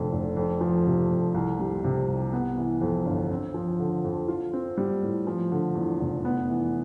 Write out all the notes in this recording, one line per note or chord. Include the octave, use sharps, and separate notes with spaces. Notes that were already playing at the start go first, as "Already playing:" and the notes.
Already playing: F1 F2 D3
F1
F2
F3
C3
F2
C2
G3
C3
C2
B3
E3
F2
G1
C4
F3
D3
F2
F4
C4
G3
A2
F3
D3
E2
F1
B3
E3